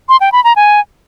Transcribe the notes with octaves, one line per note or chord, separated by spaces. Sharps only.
C6
G5
B5
A#5
G#5